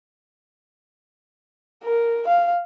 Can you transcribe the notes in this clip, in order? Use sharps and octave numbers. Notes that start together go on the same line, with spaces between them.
A#4
F5